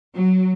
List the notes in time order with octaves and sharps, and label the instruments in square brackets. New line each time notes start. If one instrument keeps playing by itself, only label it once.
[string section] F#3